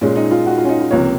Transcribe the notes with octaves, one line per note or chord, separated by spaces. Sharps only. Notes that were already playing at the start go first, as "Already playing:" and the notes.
A#2 G#3 C#4
D#4
F4
F#4
F4
C#4
D#4
F4
C#2 C3 F3 A#3 C#5